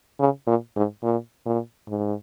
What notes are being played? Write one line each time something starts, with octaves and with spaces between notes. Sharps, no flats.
C#3
A#2
G#2
A#2
A#2
G#2